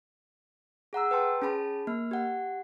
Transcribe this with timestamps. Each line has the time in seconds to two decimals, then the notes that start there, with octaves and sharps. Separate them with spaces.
0.93 G#4 F#5 A#5 E6
1.11 B4 G5 A5 C6
1.42 C#4 G#4 A5 B5
1.87 A#3 F6
2.11 G4 F#5